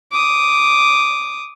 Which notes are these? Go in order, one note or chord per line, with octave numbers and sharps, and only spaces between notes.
D6 D#6